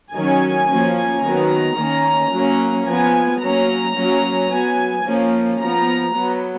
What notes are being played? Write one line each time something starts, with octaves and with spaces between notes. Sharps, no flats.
D#3 F#3 C#4 G#5
F3 A#3 C#4
D#3 F#3 B3 A#5
D#3 A#3 C#4
F#3 A#3 C#4
F3 B3 G#5
F#3 A#3 C#4 A#5
F#3 A#3 C#4
F#3 B3 G#5
F3 A#3 C#4
F3 B3 A#5
F#3 B3